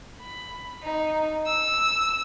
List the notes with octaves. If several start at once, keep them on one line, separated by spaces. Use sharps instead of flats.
B5
D#4
E6